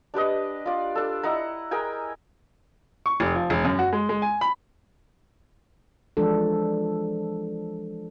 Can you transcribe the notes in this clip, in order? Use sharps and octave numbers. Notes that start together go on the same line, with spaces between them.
D4 G4 B4 D#5
F4 D5
D4 A4
E4 D#5 F#5 A#5
G#4 A#4 G5 G#5
C#6
F1
F3
E1
F#2
F#4
G#3
G#3
G#5
B5
E3 F3 G#3 D4 A4